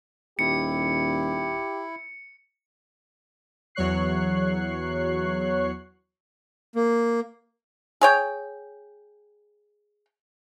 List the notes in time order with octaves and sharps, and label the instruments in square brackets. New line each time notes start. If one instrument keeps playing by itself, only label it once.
[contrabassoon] D#1 [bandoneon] E4 [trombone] G4 [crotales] C#7
[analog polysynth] E2 F#3 C#5 C#6 F#6 C7
[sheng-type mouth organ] A#3
[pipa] G#4 C#5 G5